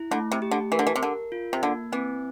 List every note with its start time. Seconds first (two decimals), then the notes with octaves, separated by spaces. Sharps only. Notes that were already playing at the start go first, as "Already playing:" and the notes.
Already playing: E4
0.11 D3 A3
0.32 C3
0.42 G4
0.51 D3
0.72 E3 A#4
0.79 D3
0.87 E3
0.96 C3
1.02 D3 A#4
1.32 F4
1.53 C3
1.63 D3 A#3
1.92 E3 C4